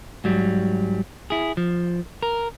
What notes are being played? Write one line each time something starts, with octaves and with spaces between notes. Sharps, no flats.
G#2 F#3 G3
E4 G#4
F3
A#4